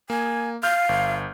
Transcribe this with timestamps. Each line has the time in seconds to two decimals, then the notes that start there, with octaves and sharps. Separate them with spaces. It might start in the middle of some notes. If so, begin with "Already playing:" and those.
0.10 A#3 G#5
0.63 F5 F6 G6
0.89 G1